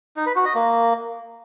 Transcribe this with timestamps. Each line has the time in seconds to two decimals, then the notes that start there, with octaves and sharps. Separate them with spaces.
0.17 D#4
0.26 B4
0.36 F#4
0.45 D#5
0.55 A#3